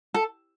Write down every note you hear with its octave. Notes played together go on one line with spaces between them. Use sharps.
A4